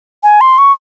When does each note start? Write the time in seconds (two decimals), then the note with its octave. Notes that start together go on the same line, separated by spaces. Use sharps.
0.23 G#5
0.41 C6
0.58 C#6